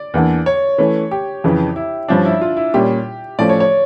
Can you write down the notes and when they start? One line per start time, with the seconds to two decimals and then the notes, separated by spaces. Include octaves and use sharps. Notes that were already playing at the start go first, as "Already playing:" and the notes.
Already playing: D5
0.14 E2 E3 A#3 D4
0.46 C#5
0.78 E3 A3 C#4
1.11 G4
1.44 F2 C#3 E3
1.76 E4
2.08 G2 F3 C#4 D4
2.25 E4
2.41 F4
2.57 E4
2.74 A#2 G3 C#4 G4
3.39 A2 F3 A3 C#4 D5
3.49 C#5
3.60 C#5